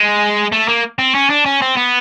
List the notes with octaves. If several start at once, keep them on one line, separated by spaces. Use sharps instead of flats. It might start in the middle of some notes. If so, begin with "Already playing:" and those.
Already playing: G#3
A3
A#3
C4
C#4
D4
C#4
C4
B3